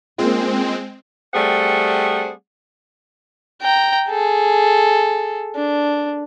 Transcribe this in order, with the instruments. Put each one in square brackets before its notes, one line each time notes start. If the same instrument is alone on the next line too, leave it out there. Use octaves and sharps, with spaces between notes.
[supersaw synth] G#3 C4 [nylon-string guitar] A#3 C#4 F4
[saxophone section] G3 A3 C4 G#4 D5 F#5
[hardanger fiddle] G5 A#5
G#4 A4
D4